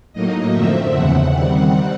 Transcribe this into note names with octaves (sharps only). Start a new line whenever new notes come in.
A2 F#3 A#3 D#4 D#5
F#2 D3 F3 A3 C4 E5
E2 C#3 E3 F#5
D#3 G3 C4